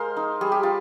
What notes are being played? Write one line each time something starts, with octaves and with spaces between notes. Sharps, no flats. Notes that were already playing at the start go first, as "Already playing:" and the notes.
Already playing: G#3 A#4 C5 F5
D#4
G3 G#4
G4
F4